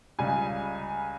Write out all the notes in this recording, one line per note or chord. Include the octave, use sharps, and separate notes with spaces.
C#2 C#3 G3 G#5